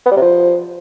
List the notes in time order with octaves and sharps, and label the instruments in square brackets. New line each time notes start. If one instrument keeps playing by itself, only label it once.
[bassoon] B3
G3
C3
F3